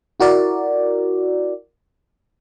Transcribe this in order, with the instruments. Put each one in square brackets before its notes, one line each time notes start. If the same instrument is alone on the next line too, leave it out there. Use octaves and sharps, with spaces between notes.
[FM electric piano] E4 F#4 A#4 D5